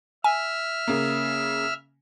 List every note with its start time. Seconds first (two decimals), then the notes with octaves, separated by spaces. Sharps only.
0.24 E5 G#5 F6
0.87 C#3 A#3